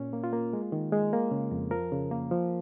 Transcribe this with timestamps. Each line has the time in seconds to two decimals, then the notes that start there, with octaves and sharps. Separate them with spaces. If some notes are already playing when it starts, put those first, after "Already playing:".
Already playing: A#2 A#3 C#4
0.13 A#3
0.24 F4
0.33 A#3
0.53 G#3
0.72 D#3
0.93 G#3
1.13 A#3
1.31 C#3
1.51 F2
1.71 F3 A#4
1.92 C#3
2.11 A#3
2.31 F3